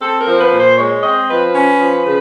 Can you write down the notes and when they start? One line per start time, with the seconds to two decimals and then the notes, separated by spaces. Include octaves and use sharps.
0.01 C4 A4
0.20 A#4
0.27 F3
0.39 B4
0.52 A#2
0.58 C5
0.77 G#3 C#5
1.02 C4 D#5
1.29 F3 B4
1.54 C#4
1.79 F3
2.05 C#3